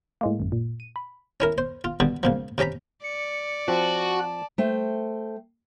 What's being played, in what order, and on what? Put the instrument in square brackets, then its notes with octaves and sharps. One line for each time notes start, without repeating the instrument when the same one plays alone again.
[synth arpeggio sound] A2 G#3 A#3
G#1 F#2
A#2
D#7
B5
[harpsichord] C#4 E4 A#4
C5
F4
B2 D3 G3
C#2 A#2 F3
C3 C#4 G4 A#5 B5
[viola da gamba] D5 [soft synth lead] C#7
[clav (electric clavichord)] F3 C4 [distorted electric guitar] F#4 [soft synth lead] A5
[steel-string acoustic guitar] A3 C5 G5